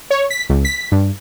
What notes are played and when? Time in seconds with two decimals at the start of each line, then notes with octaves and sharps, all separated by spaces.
0.11 C#5
0.30 B6
0.49 C#2
0.65 B6
0.92 G2